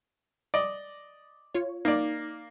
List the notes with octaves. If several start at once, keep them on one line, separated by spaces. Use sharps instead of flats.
D5 D#5
F4 C#5
A#3 D#4 D5